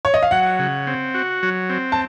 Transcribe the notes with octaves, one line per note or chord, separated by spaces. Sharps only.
C#5
D#5
F5
F#3 F#5
C#3
C4
F#4
F#3
C4
A5